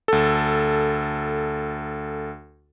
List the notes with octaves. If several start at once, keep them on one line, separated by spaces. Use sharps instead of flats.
D2 A4